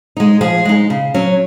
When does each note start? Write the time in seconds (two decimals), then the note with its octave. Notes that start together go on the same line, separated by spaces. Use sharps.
0.17 G#3 D#4
0.41 F3 G#4
0.65 G#3 D#4
0.90 C#3
1.14 F#3 C#4